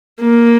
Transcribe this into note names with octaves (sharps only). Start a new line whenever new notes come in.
A#3